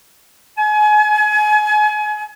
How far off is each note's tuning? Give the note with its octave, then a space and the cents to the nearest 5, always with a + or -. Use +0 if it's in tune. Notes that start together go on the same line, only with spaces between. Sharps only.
G#5 +30